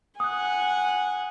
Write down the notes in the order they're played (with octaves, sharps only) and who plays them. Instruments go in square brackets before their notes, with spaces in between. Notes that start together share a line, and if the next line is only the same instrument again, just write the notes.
[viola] F#5 G#5 [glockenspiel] D#6 F#6